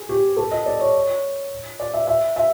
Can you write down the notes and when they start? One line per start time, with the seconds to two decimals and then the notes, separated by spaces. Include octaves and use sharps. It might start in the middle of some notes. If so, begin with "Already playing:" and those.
Already playing: G#4
0.09 G4
0.37 A4
0.51 D#5
0.66 D5
0.80 C#5
1.80 D5
1.94 E5
2.07 E5
2.36 E5